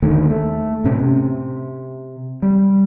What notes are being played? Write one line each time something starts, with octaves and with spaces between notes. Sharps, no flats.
D#2 D3 D#3 A3
A3
A2 C3 C#4
C3
G3